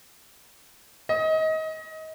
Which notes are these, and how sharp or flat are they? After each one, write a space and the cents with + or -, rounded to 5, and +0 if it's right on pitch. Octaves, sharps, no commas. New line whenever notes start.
D#5 +25